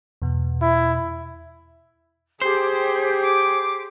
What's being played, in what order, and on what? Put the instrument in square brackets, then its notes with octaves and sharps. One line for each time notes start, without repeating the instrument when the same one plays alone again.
[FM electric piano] E2 B2
[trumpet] E4
[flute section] G4 [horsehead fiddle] G#4 [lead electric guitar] C5
[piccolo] D6